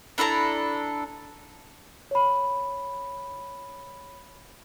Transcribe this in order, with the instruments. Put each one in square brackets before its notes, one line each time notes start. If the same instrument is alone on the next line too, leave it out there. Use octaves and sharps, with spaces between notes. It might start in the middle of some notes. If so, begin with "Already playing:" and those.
[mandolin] D4 E4 A4 A#5
[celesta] C#5 B5